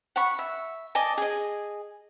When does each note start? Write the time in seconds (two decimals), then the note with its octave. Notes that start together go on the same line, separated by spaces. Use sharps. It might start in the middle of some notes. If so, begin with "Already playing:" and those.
0.16 F#5 B5 C#6
0.39 E5
0.95 D5 D#5 G#5 A5
1.18 G#4 D#5